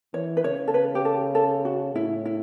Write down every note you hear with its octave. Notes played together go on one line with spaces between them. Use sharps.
E3 C#5
B4
C#3 C#5
A4
B4
G4
A4
A4
F#4
A2 E4
E4